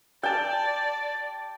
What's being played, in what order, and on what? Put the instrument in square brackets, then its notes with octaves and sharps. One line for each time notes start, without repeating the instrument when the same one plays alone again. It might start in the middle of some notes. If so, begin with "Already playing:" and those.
[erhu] D5 [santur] G5 A5